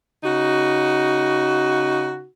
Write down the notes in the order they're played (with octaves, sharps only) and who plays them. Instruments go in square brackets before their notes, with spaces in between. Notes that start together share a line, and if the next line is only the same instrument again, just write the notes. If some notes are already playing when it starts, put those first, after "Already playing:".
[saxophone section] C#3 D#4 F#4